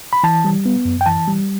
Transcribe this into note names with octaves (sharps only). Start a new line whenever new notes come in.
B5
E3 A5
G3
B3
F#2
G5
E3 A5
G3